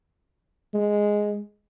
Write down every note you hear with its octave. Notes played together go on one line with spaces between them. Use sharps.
G#3